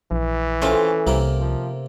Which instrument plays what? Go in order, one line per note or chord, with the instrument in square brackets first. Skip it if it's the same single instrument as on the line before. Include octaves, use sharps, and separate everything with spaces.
[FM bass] A#1 [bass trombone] E3
[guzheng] A3 C#4 [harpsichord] C4 F4
[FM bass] C2 [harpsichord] C3 A#3 A#4
[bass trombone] F3